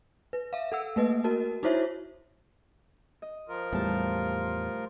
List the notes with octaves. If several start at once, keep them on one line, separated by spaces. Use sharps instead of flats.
B4
E5 F5
A4 F#5 E6
A3 A#3 B4 D#5
F#4 A#4 A5
D#4 E4 F#4 C5 C#5 E5
D#5
F3 F4 A#4
E2 A2 G3 A3 A5